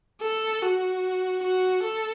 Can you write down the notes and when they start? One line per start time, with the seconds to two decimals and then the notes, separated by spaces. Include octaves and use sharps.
0.22 A4
0.63 F#4
1.43 F#4
1.84 A4